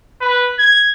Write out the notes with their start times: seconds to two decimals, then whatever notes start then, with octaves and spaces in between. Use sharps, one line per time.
0.21 B4
0.59 G#6